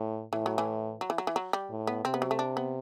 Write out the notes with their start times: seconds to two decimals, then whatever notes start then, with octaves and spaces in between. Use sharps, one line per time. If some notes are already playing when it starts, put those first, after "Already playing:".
Already playing: A2
0.33 A2 E3
0.46 F#3
0.58 E3
1.01 F#3
1.10 E3
1.18 F#3
1.27 E3
1.36 F#3
1.53 G3
1.70 A2
1.87 B3
2.05 C3 C4
2.14 B3
2.22 F#3
2.31 A3
2.39 D4
2.57 B3